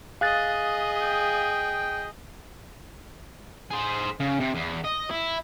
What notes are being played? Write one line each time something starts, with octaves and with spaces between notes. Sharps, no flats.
G#4 D#5 F5 F#6 A6
G5
G#4 C5
C#3
C3
E2
D#5
E4